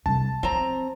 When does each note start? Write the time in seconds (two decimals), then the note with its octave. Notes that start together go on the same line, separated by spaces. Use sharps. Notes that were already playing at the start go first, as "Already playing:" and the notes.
0.06 C2 G3 A5
0.43 F3 C4 A#5